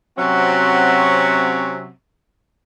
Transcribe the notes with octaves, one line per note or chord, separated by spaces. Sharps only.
C3 F#3 C4 C#4 F#4 E5